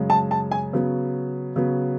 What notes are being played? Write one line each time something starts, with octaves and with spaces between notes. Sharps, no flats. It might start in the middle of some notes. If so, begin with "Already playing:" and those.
Already playing: F#2 C#3 G#3
A5
A5
G#5
C#3 F#3 B3
C#3 F#3 B3